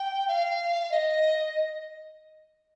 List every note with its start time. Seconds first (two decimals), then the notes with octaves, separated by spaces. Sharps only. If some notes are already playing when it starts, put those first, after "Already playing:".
Already playing: G5
0.27 F5
0.91 D#5